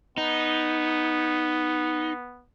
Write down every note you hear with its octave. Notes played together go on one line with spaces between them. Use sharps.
B3 D#4